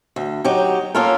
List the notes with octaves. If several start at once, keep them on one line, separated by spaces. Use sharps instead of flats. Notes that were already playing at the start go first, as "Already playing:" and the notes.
D2
F#3 D#4 G4
A#3 C#4 F4 A4 A#4